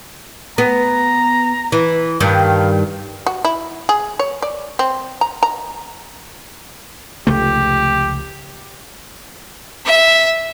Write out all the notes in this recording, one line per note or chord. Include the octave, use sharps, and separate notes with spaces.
B3 A#5
E3
G2 D#3 F5
F#4
E4
G#4
C#5
D5
C4
A#5
A#5
F1 C#2 A3 G4
E5